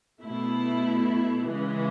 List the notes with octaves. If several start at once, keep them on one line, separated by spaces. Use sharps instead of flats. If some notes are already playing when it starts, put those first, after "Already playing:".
B2 A3 E4
C#3 E3 G#3